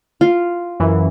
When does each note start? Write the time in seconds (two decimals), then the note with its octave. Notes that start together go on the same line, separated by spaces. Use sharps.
0.21 F4
0.80 F#2 E3